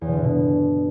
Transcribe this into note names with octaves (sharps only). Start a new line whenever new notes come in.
E2
B2
D3
G2
B2